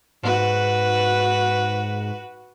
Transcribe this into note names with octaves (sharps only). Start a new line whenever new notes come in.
G#2 F#4 B4